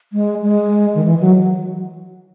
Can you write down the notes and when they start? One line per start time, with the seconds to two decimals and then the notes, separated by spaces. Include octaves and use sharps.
0.13 G#3
0.43 G#3
0.95 D#3
1.04 E3
1.20 F#3